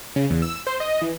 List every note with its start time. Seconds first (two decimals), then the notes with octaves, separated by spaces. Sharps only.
0.16 C#3
0.30 E2
0.42 E6
0.67 C5
0.80 D#5
1.01 E3